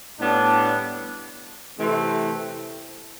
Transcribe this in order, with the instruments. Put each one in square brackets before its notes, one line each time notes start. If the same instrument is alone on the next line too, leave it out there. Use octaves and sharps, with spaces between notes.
[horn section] A2 G3 B3 D4
C3 E3 A3 C4